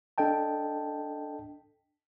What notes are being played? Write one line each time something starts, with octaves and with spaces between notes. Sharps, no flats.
D4 A4 D#5 G5 A5